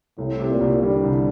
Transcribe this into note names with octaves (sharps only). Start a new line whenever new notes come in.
C2 A2
C3
A#2
C2
D3 G3
C2